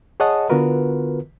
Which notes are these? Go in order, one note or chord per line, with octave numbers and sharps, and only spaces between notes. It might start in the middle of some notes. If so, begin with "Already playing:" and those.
G#4 C#5 D#5 F#5 A5 D#6
D3 B3 F4 F#4 A#4 B4